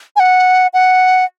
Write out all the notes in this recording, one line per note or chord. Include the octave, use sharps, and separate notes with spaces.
G#5
F#5
F#5